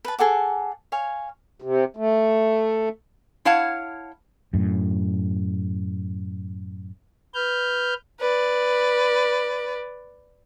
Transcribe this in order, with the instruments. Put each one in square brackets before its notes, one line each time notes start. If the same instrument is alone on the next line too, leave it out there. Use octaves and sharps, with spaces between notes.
[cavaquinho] B4 A5
G#4 A4 F#5 D6
C#5 F5 G#5
[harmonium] C3
A3
[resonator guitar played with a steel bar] E4 C#5 F5 F#5 A5
[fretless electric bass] F#2 A2
[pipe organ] B4 F6 G6
[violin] B4 D5